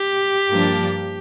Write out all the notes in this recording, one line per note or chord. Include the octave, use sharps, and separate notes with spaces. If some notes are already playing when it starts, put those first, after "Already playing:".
Already playing: G4
G2 F3 A#3 D4